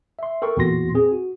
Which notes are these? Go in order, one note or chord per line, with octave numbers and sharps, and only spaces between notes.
E5 C6
A4 A#4 G5 C#6
E2 A#2 F#4 C6 A#6
C4 G#4
F#4